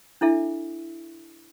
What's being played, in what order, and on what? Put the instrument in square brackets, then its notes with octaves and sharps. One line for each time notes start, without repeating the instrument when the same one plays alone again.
[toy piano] D4 E4 A4 E5